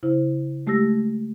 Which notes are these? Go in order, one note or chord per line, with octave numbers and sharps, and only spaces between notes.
C#3 E4 C5
G#3 A3 G4 E6 A#6